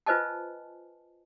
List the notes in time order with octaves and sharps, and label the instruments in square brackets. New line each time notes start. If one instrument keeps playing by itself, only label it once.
[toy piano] F4 B4 C5 D#5 G#5 A5